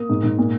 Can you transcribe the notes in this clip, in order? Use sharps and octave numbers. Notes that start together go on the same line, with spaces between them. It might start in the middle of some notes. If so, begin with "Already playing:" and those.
Already playing: A#3 D#6
G#2
G#2
A#2